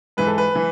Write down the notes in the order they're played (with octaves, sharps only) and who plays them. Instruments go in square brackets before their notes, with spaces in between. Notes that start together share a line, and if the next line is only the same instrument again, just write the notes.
[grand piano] G#2 E3 B4
A4
B4
E3